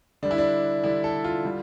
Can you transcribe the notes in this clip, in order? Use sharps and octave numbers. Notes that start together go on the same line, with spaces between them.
D3 G3 D4
E4
D4
D3 G3 E4
A4
F4
D3 G3